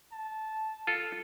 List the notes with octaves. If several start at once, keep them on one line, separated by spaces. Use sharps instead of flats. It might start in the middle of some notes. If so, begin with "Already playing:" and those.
A5
F4 A4